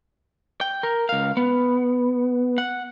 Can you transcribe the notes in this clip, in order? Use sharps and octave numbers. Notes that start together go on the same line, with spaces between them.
G5
A#4
C#2 F5
B3
F#5